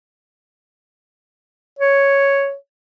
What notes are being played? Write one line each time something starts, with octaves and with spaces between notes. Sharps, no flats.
C#5